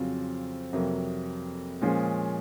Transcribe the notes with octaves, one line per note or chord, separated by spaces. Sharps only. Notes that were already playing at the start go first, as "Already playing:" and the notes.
Already playing: F2 C#3 F#3 C4 F4
F2 C3 F#3 A#3
A#2 F3 G#3 C#4 G#4